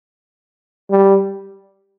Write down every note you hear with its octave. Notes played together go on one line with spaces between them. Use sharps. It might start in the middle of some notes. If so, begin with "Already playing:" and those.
G3